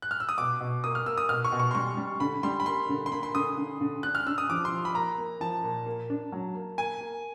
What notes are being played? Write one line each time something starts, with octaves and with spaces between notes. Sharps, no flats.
F#6
F6
E6
D#6
B2 D6
B2
A#3 D#6
F6
A#3 E6
D#6
B2 F6
C#6
B2
C#6
C6
G3 C#6
G3
D3 B5
G3 C6
B5
A#3 C6
D3
C6
A#3 B5
C6
D3 D#6
D3
D3
D4 F#6
F6
D4 E6
D#6
F3 D6
C6
F3
B5
A#3 A#5
A#3
F3 A5
A#2
A#3
D4
F#3
A#3
A#3 G#5
A#3